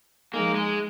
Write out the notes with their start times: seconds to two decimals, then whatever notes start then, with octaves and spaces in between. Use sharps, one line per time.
0.33 F3 G#3 A#3 D#4 G#4
0.55 G#3